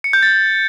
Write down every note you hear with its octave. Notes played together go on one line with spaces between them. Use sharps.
C#7
G6
A6